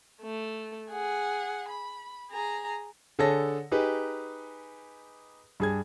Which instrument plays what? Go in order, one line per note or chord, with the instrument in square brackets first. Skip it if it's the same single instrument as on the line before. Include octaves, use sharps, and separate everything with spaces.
[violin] A3
G#4 F#5
B5
G#4 A#5
[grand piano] D3 G#4 A4 C#5 A#6
D#4 G4 G#4 B4
G2 G#4 G#6